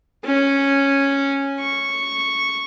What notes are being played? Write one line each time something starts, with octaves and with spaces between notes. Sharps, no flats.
C#4
C#6